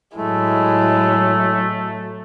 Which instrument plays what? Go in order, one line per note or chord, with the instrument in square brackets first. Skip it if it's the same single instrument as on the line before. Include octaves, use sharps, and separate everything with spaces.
[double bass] A2 F#3 [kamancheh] G#3 E4 [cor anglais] A3